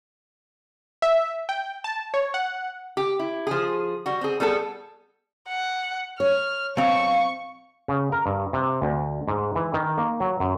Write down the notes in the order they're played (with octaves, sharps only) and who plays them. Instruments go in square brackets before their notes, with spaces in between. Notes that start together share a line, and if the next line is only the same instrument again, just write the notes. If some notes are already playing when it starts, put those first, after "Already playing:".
[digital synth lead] E5
G5
A5
C#5
F#5
[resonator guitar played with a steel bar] G4
E4
F3 G#4
G3 F#4
C4 G#4
G3 B3 G#4 A4
[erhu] F#5
[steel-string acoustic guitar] C#5 [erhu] F6
[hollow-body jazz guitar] B1 C4 [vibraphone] F5 [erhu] C#6
[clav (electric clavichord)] C#3
A#4
G2
C3
D2
G#2
E3
D#3
A#3
F#3
F#2